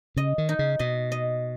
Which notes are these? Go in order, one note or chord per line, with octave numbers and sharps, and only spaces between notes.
C#3 D#5
D#3
D#4
C#3
B2 D#5
D#5